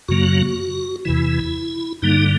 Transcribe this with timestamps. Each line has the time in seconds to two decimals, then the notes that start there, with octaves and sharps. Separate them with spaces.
0.08 F#2 C#3 F#3 A#3 F#4
1.05 E2 C3 E3 E4
2.02 G2 D3 G3 A#3 D#4